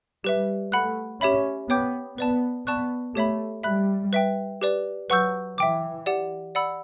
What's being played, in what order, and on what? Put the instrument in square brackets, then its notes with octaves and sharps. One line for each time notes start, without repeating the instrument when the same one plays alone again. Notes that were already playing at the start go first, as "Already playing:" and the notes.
[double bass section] G3 [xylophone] G4 B4 E5
[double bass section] A3 [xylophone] F#5 B5 F#6
[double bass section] C#4 [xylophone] G4 C#5 E5 B5
[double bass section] B3 [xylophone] C#5 G5 D6 G6
[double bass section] B3 [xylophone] B4 D5 A5
[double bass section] B3 [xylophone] D5 A5 C#6 F#6
[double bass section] A3 [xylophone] G4 C#5 E5 B5
[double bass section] G3 [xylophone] E5 B5 F#6
[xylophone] B4 E5 G5
G4 B4 D5
[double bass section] F#3 [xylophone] B4 F#5 C#6 E6 G6
[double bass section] E3 [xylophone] E5 G5 D6
[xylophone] G4 D5 F#5
D5 F#5 B5 E6